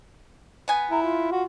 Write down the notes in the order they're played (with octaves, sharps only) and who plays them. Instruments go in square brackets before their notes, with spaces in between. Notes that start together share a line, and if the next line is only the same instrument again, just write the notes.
[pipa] B3 G#5
[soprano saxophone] E4 [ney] A#5
[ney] F4
[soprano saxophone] F#4